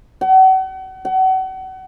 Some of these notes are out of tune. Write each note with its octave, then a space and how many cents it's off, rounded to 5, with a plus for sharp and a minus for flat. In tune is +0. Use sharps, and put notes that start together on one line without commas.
F#5 +40
F#5 +35